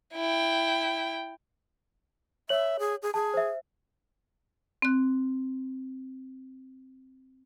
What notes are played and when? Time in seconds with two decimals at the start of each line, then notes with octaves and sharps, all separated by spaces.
0.14 E4 G5
2.49 C#5 E5 F#7
2.79 G#4
3.02 G#4
3.14 G#4 A5
3.34 C5 E5
4.82 C4 F#6